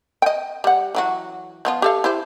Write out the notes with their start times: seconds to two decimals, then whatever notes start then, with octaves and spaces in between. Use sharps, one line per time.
0.22 D#5 G5
0.64 G3 F#5
0.95 E3 F#3 F#4
1.65 F3 B3 F4
1.82 G4 A4 F5
2.04 E4 G4 C5